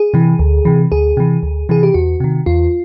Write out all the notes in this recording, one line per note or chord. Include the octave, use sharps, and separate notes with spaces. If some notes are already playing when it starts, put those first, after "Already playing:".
Already playing: G#4
C3 E3
D2
C3 E3
D2 G#4
C3 E3
D2
C3 E3 G#4
G4
E2 F#4
C3 D#3
E2 F4